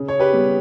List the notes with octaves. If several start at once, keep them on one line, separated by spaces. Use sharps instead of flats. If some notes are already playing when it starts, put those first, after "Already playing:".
Already playing: C#3
C#5
G4 B4
G3 B3